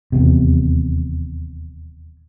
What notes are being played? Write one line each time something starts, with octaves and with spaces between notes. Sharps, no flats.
D#1 E2 C3